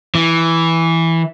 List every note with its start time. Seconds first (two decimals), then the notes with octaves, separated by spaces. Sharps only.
0.15 E3